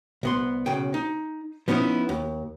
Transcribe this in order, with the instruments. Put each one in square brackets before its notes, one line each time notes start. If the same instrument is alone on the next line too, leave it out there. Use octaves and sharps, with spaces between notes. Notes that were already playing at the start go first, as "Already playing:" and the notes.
[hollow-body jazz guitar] C2 B3 C6
B1 C#3 G5
D#4
F3 B3 C#4 D#4 E4
D#2